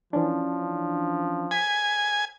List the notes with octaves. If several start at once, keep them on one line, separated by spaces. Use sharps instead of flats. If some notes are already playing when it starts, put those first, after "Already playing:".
E3 F3 C#4 D4
G#5 B6